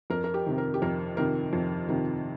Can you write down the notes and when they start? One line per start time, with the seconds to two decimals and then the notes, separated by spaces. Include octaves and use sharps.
0.10 F2 A#4
0.24 A#4
0.34 G4
0.46 C3 D#3
0.58 A#4
0.74 G4
0.82 F2 A#4
1.17 C3 D#3 A#4
1.53 F2
1.89 C3 D#3